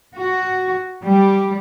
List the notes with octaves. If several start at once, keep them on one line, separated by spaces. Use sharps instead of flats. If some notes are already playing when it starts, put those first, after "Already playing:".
F#4
G3